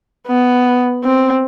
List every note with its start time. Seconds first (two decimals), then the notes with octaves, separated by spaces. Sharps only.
0.27 B3
1.04 C4